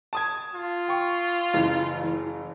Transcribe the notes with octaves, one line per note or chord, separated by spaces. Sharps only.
A5 D#6 G#6
F4
G5 C#6
F#1 E3
E3